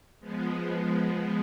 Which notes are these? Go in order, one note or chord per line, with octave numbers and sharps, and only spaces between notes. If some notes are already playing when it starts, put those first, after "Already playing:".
F3 G#3 B3